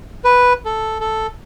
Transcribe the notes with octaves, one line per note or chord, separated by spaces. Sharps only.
B4
A4
A4